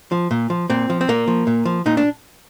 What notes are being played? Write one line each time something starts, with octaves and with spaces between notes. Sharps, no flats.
F3
A#2
F3
A#2 C4
F3
C4
A#2 A#3
F3
A#2
F3
A#2 D#4
D4